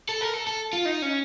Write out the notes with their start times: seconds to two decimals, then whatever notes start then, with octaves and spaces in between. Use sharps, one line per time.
0.09 A4
0.21 A#4
0.34 A4
0.47 A4
0.73 F4
0.85 D#4
1.02 C#4